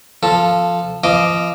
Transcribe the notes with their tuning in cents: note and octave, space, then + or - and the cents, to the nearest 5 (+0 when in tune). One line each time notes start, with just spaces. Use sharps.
F3 -5 A4 +0
F3 -25 D#5 +0 D6 +0